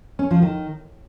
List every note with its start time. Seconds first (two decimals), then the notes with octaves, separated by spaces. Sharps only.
0.19 C#4
0.31 F3
0.42 D#3